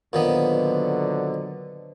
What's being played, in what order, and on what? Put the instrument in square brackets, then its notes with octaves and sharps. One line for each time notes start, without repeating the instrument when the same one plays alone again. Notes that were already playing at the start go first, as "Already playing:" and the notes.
[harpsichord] A#2 D#3 B3 [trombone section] D3 F#3 [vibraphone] B4 C5 D#5